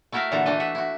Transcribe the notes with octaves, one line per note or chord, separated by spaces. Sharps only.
A3 E4 F#4 A#4 E5 F5
A#2 D3 E3 F#4 A4 A#5
E3 A3 D4 D#5
E5 F#5
E4 F#4